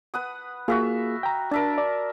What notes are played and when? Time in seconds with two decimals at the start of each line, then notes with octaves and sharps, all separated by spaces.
0.14 B4 F#5 D#6
0.68 A#3 F4 F#4 G#4 E5 F5
1.23 G5 A#5
1.51 D4 A#4 E5 A5
1.78 D5